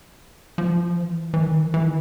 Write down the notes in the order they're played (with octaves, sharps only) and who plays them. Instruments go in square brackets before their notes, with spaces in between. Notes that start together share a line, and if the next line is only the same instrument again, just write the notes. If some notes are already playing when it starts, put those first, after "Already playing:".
[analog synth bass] F3
E3
E3
D#3
E3
E3
D#3